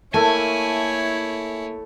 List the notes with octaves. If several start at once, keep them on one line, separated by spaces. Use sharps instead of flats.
A3 A#3 E4 A4 C#5 G#5